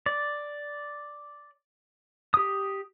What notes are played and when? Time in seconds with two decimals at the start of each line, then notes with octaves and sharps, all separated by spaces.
0.06 D5
2.34 G4 D#6